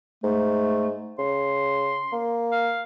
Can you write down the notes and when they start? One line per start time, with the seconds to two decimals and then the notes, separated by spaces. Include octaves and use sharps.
0.24 G#2 A3
1.19 C#3 C6
2.12 A#3
2.52 F5